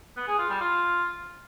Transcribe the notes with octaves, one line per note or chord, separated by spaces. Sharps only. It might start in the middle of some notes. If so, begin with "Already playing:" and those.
B3
G#4
F4
G3
F4